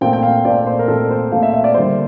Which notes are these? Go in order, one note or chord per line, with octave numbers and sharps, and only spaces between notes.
A#2 A3 C4 G5
G5
F5
A#2 A3 C4 D5
C5
A#4
A#2 A3 C4 A4
C5
A#2 A3 C4 F5
E5
E5
D5
D3 G3 A#3 C5